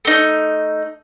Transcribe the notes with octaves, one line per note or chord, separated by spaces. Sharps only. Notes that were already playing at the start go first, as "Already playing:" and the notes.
A3 D#4